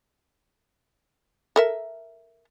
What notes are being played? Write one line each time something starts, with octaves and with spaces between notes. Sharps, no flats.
A4 A#4 E5